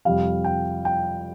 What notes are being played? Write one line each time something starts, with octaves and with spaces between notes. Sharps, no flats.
F2 C3 G3 F5
G5
G5